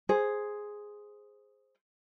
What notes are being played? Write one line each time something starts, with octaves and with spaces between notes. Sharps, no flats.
G#4 C5